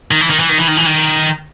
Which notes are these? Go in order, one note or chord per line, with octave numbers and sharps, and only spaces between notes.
D#3
E3
D#3
E3
D#3
E3
D#3
E3
D#3